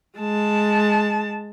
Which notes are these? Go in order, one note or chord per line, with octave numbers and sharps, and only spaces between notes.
G#3 A5